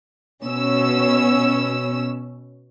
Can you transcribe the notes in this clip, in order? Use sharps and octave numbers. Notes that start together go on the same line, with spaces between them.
B2 C#4 E6